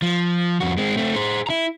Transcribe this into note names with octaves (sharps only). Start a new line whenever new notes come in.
F3
F2 F#4
G#3 C4
A3 C4
G#4 C5
E4 A#5